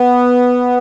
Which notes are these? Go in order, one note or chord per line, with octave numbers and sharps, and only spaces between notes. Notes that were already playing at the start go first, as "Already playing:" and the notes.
Already playing: B3